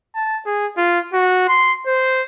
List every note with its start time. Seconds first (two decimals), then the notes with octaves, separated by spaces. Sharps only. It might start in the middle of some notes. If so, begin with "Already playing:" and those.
0.15 A5
0.46 G#4
0.77 F4
1.13 F#4
1.48 C6
1.87 C5